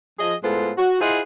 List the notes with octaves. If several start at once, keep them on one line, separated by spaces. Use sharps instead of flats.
F3 G#4 D#5
A2 G#3 B3 F4 A4 C5
F#4
E4 F4 G#4 C5 D#5 F#5